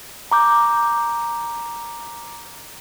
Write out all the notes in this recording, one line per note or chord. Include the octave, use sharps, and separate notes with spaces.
A#5 D6 G6